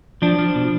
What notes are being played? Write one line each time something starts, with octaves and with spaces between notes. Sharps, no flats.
F3 D4
F3
B2